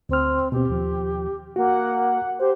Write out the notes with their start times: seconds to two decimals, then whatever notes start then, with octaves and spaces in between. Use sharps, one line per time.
0.09 D2 C4 F6
0.52 B2 C4 G4
0.70 D#2 F3
1.56 A#3 F#4 F#5
2.39 G4 C5